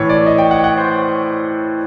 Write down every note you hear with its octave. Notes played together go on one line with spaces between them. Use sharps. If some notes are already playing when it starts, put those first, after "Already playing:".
Already playing: A2 E3 C#5
D5
D#5
G5
F#5
G5
F#5
C5